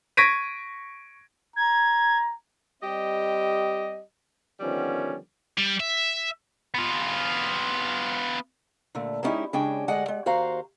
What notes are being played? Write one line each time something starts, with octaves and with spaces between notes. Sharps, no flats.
C#6 G#6 A#6 B6 D7 D#7
A#5 G#6
G3 C4 G4 D#5
D3 D#3 F3 G3 B3 C#4
G3
E5
B3 F4
A#2 D3 A3
G#3 B3 C#4 D#4 E4 G4
C#3 G#3 C#4 D4 G5
D2 G#3 D5 D#5 F#5
G#3
D#2 F#4 C5 F5 A#5